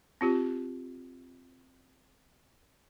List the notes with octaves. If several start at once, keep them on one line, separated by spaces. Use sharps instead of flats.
C4 F4 G4